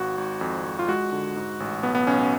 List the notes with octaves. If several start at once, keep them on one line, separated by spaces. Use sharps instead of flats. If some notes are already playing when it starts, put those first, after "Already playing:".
Already playing: G#1 F#4
G#1
F2
F2
F4
G#3 F#4
D3
G#2
A1
B1 B3
B3
B1 C#4
C#4